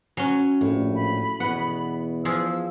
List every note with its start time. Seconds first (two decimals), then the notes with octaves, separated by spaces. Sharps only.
0.17 F#3 C#4 G#5
0.61 A#1 A2
0.95 B5
1.40 E2 B2 B3 F#5
2.25 F3 F4 G#4 E6